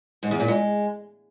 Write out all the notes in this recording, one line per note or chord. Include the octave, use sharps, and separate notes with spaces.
G#2
E2
A#2
G#3